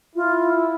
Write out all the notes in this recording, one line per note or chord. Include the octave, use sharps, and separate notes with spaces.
E4 F4